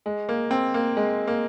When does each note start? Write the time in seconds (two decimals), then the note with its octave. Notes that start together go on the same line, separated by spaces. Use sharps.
0.06 G#3
0.29 A#3
0.51 C4
0.74 A#3
0.97 G#3
1.28 A#3